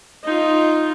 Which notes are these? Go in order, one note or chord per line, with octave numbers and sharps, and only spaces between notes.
D#4 F4